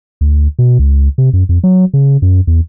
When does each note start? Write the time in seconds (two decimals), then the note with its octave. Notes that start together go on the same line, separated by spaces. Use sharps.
0.21 D2
0.59 B2
0.79 C#2
1.18 C3
1.33 F#2
1.49 F2
1.64 F#3
1.94 C#3
2.22 F#2
2.47 E2